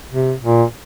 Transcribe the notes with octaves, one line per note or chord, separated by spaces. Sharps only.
C3
A#2